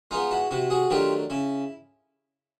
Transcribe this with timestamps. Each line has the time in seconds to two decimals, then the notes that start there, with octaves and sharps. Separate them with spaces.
0.11 G#3 B3 D#4 F4
0.31 E4 F#4
0.51 C3 E4 F#4
0.70 F#4 G#4
0.90 D#3 F#3 A3 D4 F4 G4
1.30 C#3 E4